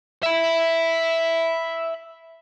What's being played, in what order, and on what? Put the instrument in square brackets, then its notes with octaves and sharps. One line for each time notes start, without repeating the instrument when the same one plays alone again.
[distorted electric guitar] E5 B5